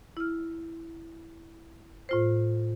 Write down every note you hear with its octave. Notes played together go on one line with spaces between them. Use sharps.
E4 F6
A2 F4 C5